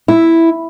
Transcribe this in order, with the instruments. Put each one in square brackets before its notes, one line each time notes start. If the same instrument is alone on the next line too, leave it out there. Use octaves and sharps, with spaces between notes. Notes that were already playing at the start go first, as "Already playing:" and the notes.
[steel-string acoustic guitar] E4